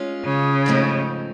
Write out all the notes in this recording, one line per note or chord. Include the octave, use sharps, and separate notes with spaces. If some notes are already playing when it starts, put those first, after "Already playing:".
Already playing: G#3 C#4 F4
C#3
G#2 F3 A3 C4 D#4